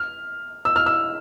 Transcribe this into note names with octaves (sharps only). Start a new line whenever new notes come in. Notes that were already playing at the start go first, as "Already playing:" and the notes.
Already playing: F6
E6
F6
E6